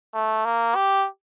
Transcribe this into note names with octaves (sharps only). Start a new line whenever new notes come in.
A3
A#3
G4